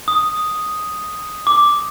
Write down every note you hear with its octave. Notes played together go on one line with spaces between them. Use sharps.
D#6
D6